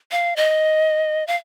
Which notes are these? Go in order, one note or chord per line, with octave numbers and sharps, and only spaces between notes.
F5
D#5
F5